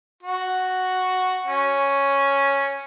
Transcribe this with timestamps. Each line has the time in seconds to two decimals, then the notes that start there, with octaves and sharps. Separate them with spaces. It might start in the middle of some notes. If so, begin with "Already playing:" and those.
0.23 F#4
1.47 C#4